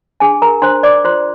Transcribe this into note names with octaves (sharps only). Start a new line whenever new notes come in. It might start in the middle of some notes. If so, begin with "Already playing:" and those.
D4 G#4 G#5
A#4 A#5
D4 C5 C6
D5 D6
F4 C5 C6